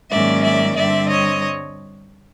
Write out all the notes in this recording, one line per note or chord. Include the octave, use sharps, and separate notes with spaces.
G#2 D#3 F#3 A#3 C#4 D5 E5
D5 E5
G2 D3 G3 C4 D5 E5
C#5 D#5